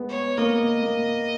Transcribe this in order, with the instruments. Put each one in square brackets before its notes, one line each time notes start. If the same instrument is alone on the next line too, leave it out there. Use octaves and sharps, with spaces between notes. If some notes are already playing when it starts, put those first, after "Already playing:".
Already playing: [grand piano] G#3 B3
[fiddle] C#5
[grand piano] A#3 [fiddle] D#5
[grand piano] A#3